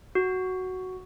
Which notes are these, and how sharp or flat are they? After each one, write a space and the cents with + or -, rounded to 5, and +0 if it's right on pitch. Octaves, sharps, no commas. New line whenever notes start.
F#4 +5